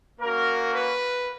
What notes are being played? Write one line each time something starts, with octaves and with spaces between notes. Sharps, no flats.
A#3 C#4 F#4 A#4
B4